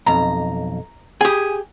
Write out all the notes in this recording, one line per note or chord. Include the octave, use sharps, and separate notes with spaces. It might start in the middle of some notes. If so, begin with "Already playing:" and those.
B1 F2 A#5
G4 G#4 G#5 D#6